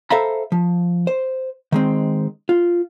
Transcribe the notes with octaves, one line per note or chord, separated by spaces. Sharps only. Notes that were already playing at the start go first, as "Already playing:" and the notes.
A4 C5 E5 F5 A#5 B5
F3
C5
D#3 G#3 C4
F4